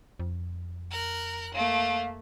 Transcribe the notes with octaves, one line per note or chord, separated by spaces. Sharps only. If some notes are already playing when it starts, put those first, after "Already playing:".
F2
A#4 F#6
A3 A#3 F5